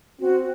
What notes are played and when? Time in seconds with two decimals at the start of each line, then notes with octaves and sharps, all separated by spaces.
0.21 C4 F#4